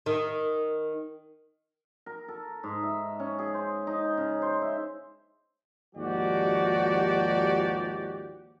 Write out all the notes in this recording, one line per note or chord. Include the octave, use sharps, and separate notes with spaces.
D#3
A#4
A4
G#2
E5
C#4
G#4
C5
D#4
C#3
C5
E5
D#2 G#2 F3 F#4 G4 D5